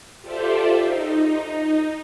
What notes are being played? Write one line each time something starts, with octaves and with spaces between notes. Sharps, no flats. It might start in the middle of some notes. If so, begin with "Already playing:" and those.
F4 G4 A4 C5 D5 E5
D#4